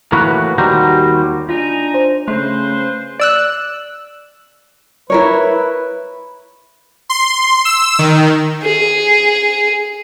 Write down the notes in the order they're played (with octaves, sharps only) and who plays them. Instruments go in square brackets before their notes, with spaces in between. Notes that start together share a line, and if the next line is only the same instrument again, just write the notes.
[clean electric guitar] A2 E3 A#3 F#4 B4
D#2 G3 F#4 C5 A#5
[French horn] D4 [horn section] D#4 G#5 A#5 [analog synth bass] F4
[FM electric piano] C5
[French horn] C#3 [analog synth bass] A3 [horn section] B4 C5 [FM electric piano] C6
[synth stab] D5 E6 F#6
[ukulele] E4 A#4 C#5 [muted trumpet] B4
[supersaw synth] C6
E6
D#3
[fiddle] G#4